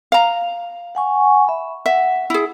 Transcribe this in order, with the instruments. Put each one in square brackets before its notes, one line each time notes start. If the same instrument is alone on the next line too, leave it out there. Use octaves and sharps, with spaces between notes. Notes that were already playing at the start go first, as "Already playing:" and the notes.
[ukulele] F5 A#5
[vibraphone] F#5 G#5 C#6
E5 B5
[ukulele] E5 [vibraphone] F#5
[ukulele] E4 G#4